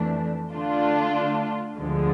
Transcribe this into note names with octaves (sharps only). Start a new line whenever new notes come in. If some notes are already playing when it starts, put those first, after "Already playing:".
Already playing: F2 E3 A3 D4
D3 A3 D4 F4
D2 D3 F3 G#3